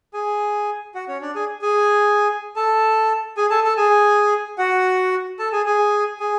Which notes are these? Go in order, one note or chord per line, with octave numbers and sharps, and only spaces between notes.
G#4 G#5
F#4 F#5
C#4 C#5
D4 D5
G#4 G#5
G#4 G#5
A4 A5
G#4 G#5
A4 A5
A4 A5
G#4 G#5
F#4 F#5
A4 A5
G#4 G#5
G#4 G#5
G#4 G#5